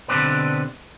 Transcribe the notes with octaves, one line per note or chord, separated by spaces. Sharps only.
B2 D3 C4 D4 G4 B4